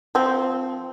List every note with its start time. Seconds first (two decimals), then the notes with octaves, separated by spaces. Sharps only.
0.15 F3 C4